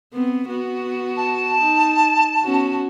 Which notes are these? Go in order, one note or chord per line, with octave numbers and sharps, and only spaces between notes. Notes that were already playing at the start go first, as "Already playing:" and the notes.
B3 C4
B3 F#4
A5
D#4
B3 C#4 F#4